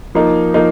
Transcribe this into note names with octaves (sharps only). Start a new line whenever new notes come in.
F3 A#3 D#4
F3 A#3 D#4